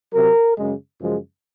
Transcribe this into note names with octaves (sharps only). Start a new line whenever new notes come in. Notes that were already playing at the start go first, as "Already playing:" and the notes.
C3 F#3 A#4
F#2 C#3 G#3
F#2 C#3 F3 G#3